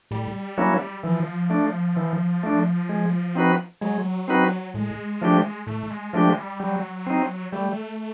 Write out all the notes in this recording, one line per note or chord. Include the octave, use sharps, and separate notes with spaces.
A2 G3
F#3 A#3 C#4 E4
E3 F3
A3 D4
E3
A3 D4
G#3
C4 D#4 F#4 B4
F#3 G#3
C4 D#4 F#4 B4
A2 G#3
F3 A3 D4 G4
A2 A3
A3
G#3
F3 G#3 A3 D4 G4
G3
F#3 G3
C4 D#4
G3 A3